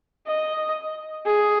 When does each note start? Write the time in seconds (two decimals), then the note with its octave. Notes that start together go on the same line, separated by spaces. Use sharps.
0.27 D#5
1.25 G#4